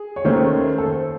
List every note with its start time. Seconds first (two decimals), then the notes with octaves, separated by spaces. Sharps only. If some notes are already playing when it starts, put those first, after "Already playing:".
Already playing: G#4
0.16 C#5
0.25 D#2 D#3 A3 C#4 C5
0.78 A4
0.86 C5